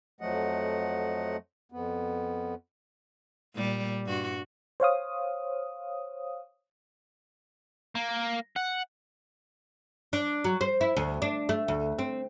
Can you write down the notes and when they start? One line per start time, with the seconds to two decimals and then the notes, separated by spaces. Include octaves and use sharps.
0.21 F2 F3 F#3 A3 D#5 F#5
1.72 F2 B3
3.54 A#2 G3
4.06 G2 F#4
4.80 C5 C#5 F5 D#6
7.95 A#3
8.56 F#5
10.13 D4
10.44 F#3
10.61 C5
10.81 E4
10.97 D2
11.22 D4
11.49 A3
11.68 D2
11.99 C4